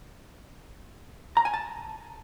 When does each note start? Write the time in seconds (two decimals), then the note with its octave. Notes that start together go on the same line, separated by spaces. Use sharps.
1.37 A#5
1.45 G#5
1.54 A5